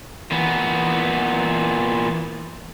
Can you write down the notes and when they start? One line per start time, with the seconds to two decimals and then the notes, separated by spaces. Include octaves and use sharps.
0.31 A#2 E3 B3